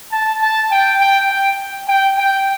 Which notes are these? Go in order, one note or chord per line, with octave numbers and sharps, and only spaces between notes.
A5
A5
G5
G5
G5
G5
G5